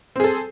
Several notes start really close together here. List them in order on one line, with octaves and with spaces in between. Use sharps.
C4 G#4 A4